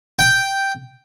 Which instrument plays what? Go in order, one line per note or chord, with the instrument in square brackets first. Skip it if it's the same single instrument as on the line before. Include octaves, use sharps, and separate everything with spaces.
[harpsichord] G5